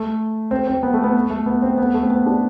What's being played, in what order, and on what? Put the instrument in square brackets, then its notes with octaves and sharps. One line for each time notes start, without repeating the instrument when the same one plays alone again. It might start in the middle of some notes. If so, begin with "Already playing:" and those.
Already playing: [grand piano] A3
C4
C4
B3
A3
B3
A3
B3
C4
B3
A3
C4
B3
D4